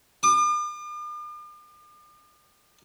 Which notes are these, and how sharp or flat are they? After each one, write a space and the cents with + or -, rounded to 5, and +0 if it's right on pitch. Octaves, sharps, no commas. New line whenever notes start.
D6 +45